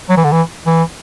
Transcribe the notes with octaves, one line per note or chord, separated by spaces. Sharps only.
F#3
E3
D3
E3
E3